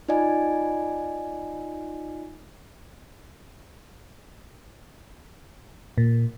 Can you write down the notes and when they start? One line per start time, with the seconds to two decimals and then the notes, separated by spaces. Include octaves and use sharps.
0.08 D#4 F4 D5 D#5 G#5
5.98 A#2